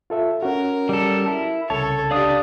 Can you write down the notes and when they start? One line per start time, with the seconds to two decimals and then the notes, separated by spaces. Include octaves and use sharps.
0.10 F4 A4 E5
0.43 C#4 F#4 A#4
0.89 G3 A4
1.28 E4
1.70 C2 C#3 A4 C#5 A5
2.11 D4 G4 D5 F5 D#6